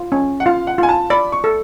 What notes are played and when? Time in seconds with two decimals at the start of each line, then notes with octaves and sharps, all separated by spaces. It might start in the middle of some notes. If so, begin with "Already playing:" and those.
Already playing: F4
0.12 C#4
0.40 F#5
0.46 F4 F5
0.67 F#5
0.78 F4 G#5
0.89 A5
1.10 D5 B5
1.32 C#6
1.44 A4